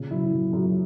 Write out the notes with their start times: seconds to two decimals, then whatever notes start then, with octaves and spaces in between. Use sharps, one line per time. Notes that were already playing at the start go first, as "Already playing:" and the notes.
Already playing: A#2 C#3
0.11 F#2 E4
0.33 F#2
0.53 F#2